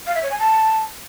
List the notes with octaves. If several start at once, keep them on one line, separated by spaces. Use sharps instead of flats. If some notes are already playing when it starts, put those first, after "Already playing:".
F5
E5
C#5
G#5
A5